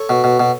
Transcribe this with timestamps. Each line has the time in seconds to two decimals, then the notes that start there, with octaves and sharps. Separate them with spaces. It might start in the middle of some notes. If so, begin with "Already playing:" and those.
Already playing: A4 C#5
0.09 B2
0.24 B2
0.40 B2